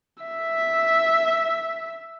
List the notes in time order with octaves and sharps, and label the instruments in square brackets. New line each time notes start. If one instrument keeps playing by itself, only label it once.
[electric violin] E5